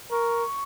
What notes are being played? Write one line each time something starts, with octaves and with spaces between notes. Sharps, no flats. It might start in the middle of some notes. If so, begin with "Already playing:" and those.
A#4 C#6